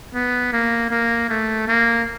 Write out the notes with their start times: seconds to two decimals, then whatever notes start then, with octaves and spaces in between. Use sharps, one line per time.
0.14 B3
0.52 A#3
0.90 A#3
1.29 A3
1.68 A#3